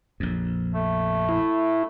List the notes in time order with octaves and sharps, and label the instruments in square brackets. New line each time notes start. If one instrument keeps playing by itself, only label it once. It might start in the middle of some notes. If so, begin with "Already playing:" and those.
[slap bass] A#1 F2
[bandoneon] A3
[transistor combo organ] E4